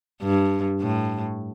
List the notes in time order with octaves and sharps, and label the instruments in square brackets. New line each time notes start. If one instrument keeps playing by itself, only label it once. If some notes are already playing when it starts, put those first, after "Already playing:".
[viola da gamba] G2
A2